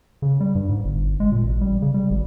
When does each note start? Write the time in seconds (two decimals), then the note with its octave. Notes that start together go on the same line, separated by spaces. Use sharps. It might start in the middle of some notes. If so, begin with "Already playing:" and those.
0.22 C#3
0.40 G3
0.55 G2
0.69 G#2
0.85 G1
1.20 G#3
1.32 A#2
1.43 A1
1.61 G3
1.82 C#3
1.94 G3
2.10 G#1